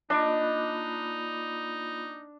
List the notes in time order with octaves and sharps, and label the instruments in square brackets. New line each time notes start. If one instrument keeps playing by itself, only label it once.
[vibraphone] A#3 F4 B5 [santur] D4 [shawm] D#4 [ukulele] D#5